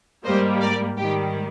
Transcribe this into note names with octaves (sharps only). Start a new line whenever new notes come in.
G#2 G3 A#3 C5 D#5
A#4 D5
G#2 D#3 G3 G4